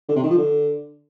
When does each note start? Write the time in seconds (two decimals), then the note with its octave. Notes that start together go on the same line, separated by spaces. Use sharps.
0.09 D3
0.16 C3
0.23 D#3
0.30 F3
0.38 D3